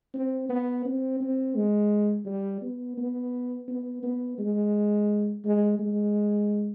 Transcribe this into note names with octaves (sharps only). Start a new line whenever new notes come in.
C4
B3
C4
C4
G#3
G3
B3
B3
B3
B3
G#3
G#3
G#3